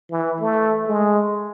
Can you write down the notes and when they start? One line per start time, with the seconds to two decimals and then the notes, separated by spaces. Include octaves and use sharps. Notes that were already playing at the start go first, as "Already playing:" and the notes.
0.11 E3
0.41 A3
0.87 G#3